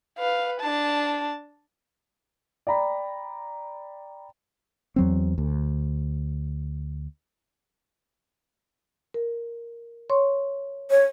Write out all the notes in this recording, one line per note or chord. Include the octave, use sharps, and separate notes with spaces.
B4 F5
D4 A5
D5 G5 A#5 B5
E2 F#3 C4
D2
A#4
C#5 C6 C#6
C#5